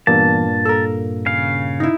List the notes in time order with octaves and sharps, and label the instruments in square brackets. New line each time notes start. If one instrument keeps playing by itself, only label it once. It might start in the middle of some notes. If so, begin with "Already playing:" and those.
[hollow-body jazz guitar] E2 [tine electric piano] G2 A#2 A#3 [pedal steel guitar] A5
[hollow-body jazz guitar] A4 A#4
[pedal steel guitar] C#3 F5
[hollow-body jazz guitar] D#4 E4